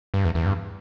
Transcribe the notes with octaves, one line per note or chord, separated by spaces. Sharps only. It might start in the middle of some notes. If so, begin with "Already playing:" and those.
G2
E2
E2
G2